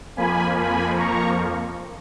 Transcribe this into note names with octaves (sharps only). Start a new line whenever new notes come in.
F2 F3 A#3 G#5 B5
G#5 B5
A#5 C#6